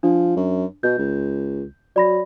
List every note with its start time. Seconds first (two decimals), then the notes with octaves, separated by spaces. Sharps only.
0.03 F3 D4
0.37 F#2
0.83 B2 G6
0.98 C#2
1.96 F#3 D5 B5 A#6